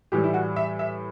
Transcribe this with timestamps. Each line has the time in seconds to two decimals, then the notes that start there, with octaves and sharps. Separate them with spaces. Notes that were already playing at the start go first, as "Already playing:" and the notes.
0.12 A2 E3 G3 G4
0.24 E4
0.34 F#4
0.56 E5
0.79 E5